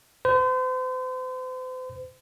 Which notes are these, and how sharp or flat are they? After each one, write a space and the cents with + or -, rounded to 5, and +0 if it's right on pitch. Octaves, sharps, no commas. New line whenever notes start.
C5 -40